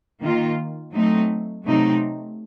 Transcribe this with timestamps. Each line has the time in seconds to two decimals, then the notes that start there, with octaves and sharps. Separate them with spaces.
0.21 D#3 A#3 F4
0.92 F#3 A3 C4 D#4
1.65 C3 F#3 A3 C4 D#4